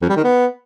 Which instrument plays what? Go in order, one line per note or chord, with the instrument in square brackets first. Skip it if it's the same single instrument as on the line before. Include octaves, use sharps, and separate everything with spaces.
[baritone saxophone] F2
G3
D#3
B3